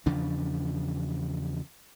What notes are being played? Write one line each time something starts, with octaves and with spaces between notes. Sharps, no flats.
E2 C#3 F3 D4